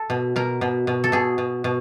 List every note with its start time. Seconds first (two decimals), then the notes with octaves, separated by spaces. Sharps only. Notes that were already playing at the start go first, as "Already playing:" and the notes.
Already playing: A4
0.10 B2
0.36 B2 A#4
0.61 B2
0.87 B2
1.04 A4
1.12 B2 G#4
1.38 B2
1.64 B2